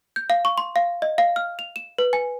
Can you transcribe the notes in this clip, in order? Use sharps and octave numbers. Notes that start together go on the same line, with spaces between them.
G6
F5
C#6
C6
F5
D#5
F5
F6
F7
E7
B4
G#5